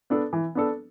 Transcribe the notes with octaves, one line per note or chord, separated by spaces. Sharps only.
B3 D4 A4
E3
B3 D4 A4